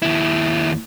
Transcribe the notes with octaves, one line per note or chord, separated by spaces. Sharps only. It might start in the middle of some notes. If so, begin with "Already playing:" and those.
D#2 E4